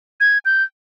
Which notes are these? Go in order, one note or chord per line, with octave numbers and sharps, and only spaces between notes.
G#6
G6